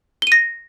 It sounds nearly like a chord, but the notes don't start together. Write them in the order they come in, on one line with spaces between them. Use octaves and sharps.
G7 D#7 A#6